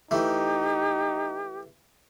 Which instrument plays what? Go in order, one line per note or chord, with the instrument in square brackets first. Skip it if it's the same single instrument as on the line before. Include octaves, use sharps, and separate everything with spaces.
[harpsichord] E3 A3 [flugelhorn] D#4 [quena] G4